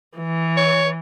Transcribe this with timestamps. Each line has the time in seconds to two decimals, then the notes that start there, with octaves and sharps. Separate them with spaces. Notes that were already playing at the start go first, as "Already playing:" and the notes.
0.18 E3
0.57 C#5